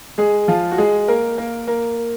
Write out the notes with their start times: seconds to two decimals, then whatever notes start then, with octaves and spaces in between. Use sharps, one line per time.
0.18 G#3 G#4
0.48 F3 F4
0.71 F#4
0.78 G#3 G#4
1.08 A#3 A#4
1.38 A#3 A#4
1.67 A#3 A#4